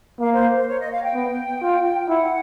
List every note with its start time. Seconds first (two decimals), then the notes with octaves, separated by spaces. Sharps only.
0.20 A#3 F5
0.33 C5
0.56 C5
0.68 C#5
0.80 D#5
0.91 F5
1.03 G5
1.14 B3
1.62 F4
2.09 E4 F#5